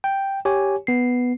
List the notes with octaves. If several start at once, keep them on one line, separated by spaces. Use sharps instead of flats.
G5
G4 C#5 G#5
B3 C7